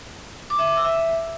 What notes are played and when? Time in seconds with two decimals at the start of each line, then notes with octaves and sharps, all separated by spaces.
0.50 D6
0.59 E5
0.67 D6
0.76 E6
0.85 E5